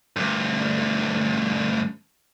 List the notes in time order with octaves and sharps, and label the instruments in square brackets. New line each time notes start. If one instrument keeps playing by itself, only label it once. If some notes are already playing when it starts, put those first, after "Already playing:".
[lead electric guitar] D2 G2